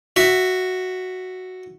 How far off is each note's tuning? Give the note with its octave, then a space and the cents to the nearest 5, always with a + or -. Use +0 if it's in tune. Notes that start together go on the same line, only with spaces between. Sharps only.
F#4 +0 E5 +0